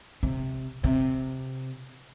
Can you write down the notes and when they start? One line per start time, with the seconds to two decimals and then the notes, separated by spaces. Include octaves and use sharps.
0.23 C3
0.84 C3